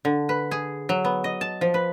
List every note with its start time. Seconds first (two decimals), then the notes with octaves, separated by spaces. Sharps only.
0.05 D3
0.29 B4
0.51 G#4
0.89 F#3
1.05 B3
1.24 D#5
1.41 A5
1.61 F3
1.74 B4